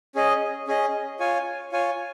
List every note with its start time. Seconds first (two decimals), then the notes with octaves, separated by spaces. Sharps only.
0.15 C#4 G#4 D#5
0.68 C#4 G#4 D#5
1.20 F4 C#5 G#5
1.72 F4 C#5 G#5